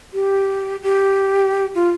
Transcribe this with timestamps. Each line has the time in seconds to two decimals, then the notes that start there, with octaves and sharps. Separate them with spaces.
0.14 G4
0.83 G4
1.75 F4